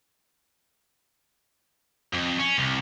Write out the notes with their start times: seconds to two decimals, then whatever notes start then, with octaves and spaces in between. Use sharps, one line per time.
2.13 F2
2.38 C#4
2.58 C2